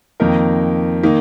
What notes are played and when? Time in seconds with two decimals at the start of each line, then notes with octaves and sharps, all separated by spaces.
0.20 F2 D#3 A#3 D#4 A#4
1.03 D#3 A#3 D#4